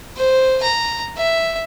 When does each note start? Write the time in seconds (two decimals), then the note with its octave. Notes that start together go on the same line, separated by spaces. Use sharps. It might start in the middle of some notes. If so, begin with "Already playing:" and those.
0.17 C5
0.63 A#5
1.17 E5